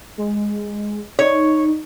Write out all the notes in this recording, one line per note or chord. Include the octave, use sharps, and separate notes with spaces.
G#3
D#4 C#5